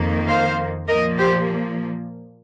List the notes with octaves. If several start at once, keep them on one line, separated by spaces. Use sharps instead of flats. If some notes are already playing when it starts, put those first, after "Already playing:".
Already playing: F2 D#3 A#3
C5 F5
A#2 F3 A#3 A#4 D#5
G4 C5